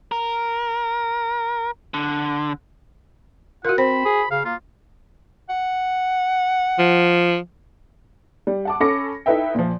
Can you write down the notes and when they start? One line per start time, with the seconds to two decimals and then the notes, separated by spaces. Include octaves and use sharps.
0.12 A#4
1.94 D3
3.65 F4 F#4 A#4 F#5
3.78 C4 C5 B5
4.05 G#4
4.31 C#3 F5
4.45 A#3 F4
5.49 F#5
6.79 F3
8.47 G3
8.65 F#5 A5 D6
8.80 C#4 A4 B5 D6 A#6 C#7
9.26 D#4 E4 A4 B4 E5 G5
9.55 A#2 F3